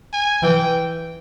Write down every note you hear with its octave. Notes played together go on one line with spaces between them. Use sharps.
G#5
E3 G5